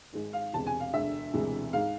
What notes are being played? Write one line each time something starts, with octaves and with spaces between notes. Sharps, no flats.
G#1 G#2 G#3
F5
E1 E2 C3 G#3 A5
G#5
F5
E1 D2 D3 G#3 E5
E1 D2 C3 E3 G#3
G#2 G#3 F5